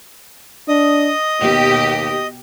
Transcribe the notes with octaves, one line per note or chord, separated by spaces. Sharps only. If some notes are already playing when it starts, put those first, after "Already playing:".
D4 D#5 D#6
D#2 B2 G4